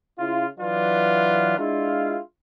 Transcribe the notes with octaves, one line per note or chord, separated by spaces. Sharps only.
C#3 E4 F4
E3 F#3 D4 F4 B4
G#3 D4 E4 F4